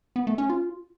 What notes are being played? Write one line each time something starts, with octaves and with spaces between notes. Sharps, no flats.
B3
A3
C#4
F4